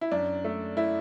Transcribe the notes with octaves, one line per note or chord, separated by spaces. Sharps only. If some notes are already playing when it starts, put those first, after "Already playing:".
E4
F#2 D4
A3
A3 E4